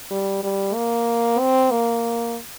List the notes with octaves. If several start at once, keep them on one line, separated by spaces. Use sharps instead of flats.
G3
G3
A#3
C4
A#3